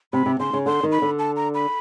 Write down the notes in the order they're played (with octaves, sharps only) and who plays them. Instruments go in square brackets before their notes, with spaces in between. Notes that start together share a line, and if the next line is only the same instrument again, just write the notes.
[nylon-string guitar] C3 [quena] B5
[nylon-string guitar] C3
[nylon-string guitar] C#3 [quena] C6
[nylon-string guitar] C#3
[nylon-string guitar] D3 [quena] C6
[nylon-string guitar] D#3
[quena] B5
[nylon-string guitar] D3
[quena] A5
A#5
B5